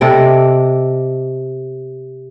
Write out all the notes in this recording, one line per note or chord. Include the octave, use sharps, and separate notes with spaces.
C3 A4 D5 D#5